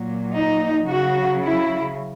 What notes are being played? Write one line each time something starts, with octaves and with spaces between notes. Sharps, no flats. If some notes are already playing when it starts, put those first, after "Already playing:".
Already playing: A#2 F#3
D#4
C#3 F#3 F#4
E4